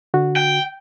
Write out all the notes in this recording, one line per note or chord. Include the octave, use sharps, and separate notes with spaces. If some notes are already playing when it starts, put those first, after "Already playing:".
D3 F#4
G5